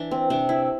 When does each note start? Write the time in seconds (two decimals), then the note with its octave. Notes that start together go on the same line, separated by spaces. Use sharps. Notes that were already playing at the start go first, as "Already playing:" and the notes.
Already playing: E3 D4
0.11 C4
0.30 C3 D4
0.49 E4